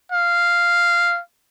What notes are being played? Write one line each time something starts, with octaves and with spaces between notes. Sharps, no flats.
F5